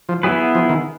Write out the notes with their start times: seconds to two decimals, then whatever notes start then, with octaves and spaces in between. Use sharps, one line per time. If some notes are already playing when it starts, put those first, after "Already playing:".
0.09 F3
0.23 F#3 B3 E4 G#4 B4
0.55 F3
0.69 D#3